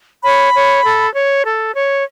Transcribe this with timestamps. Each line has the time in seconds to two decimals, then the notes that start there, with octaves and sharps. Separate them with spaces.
0.24 C#5 B5
0.54 C#5
0.85 A4
1.15 C#5
1.45 A4
1.75 C#5